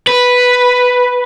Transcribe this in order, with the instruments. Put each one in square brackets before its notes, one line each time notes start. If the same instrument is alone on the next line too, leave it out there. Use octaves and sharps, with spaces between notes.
[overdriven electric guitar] B4